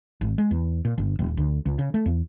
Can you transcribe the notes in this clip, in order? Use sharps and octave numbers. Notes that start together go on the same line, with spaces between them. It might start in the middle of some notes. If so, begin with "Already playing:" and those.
G#1
G#3
E2
A#2
G1
D#1
D2
C#2
C#3
A3
E2